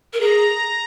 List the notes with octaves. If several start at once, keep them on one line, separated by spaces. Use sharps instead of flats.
A#4
G#4 A#5